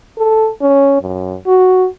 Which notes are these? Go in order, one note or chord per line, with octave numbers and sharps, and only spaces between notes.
A4
C#4
F#2
F#4